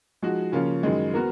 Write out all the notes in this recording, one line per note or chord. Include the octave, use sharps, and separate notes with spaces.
F3 G#3 D#4 F#4
C#3 F3 A#3 C#4 F4
F#2 D#3 G#3
B3 F#4 A#4